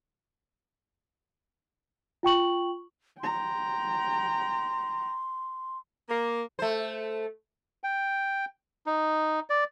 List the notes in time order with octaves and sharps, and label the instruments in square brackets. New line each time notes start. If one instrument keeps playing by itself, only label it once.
[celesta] F4 G5 C#6 F#7
[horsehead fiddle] G5 A#5 [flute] C6
[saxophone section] A#3
[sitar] A3 C5
[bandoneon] G5
D#4
D5